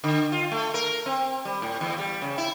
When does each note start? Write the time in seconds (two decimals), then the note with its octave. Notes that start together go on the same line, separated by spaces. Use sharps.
0.04 D3
0.32 F4
0.51 A3
0.74 A#4
1.06 C4
1.45 G3
1.62 A2
1.81 E2
1.98 G3
2.22 C#3
2.38 E4